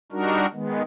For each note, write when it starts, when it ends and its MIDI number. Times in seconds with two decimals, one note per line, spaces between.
0.12 0.46 55
0.12 0.46 62
0.12 0.46 63
0.12 0.46 66
0.12 0.46 70
0.53 0.82 51
0.53 0.82 56
0.53 0.82 59